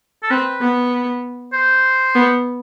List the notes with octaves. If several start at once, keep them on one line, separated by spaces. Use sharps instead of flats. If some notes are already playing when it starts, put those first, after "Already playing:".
A4
C4 B4
B3
C5
B3